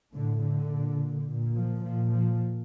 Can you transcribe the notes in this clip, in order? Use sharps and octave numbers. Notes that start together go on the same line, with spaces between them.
A2 D3
D3
A#2
A#2
F3
A#2 F3
F3